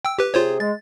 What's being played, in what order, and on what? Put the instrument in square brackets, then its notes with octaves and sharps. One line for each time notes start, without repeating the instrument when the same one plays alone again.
[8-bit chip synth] G5 E6
G4 B4
[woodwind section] C3 G#4 [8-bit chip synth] F4 C5 C#5
[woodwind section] G#3 [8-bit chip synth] A6